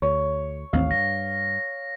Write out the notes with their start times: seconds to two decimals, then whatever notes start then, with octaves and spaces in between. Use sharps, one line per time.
0.02 D2 C#5
0.73 A1 D#2 C4 F5
0.91 G2 A#6